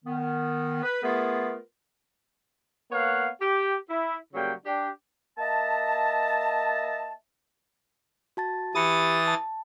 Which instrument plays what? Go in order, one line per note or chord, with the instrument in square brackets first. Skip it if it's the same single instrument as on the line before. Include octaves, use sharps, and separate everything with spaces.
[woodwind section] D#3 B3
B4
A3 B3 F4 G#4 A#4 B4
[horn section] A#3 B3 C#5 F5 F#5
G4
E4
C#3 F#3 G3 A#3 G5
D4 G4
[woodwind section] A#3 D#5 E5 A5
[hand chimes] F#4 A5 A6
[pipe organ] E3 D#6 A6 [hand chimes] G4 B5 C#7
[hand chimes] A5